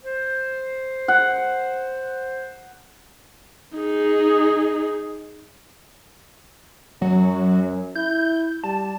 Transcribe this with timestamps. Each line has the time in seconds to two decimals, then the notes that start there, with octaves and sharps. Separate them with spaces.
0.02 C5
1.08 F#5
3.77 D#4 G#4
7.02 F#2 F#3
7.95 E4 G6
8.64 G3 A5